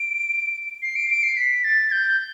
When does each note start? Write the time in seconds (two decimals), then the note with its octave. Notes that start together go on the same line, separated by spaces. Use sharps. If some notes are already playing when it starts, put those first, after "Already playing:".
Already playing: D7
0.82 C7
0.96 D7
1.10 D7
1.23 C7
1.37 B6
1.64 A6
1.92 G6